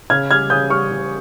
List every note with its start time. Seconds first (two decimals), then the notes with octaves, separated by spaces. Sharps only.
0.10 C#3 F6 G#6
0.31 G3 F6 G#6
0.50 C#3 D#6 G6
0.70 G3 C#6 F6
0.91 C#3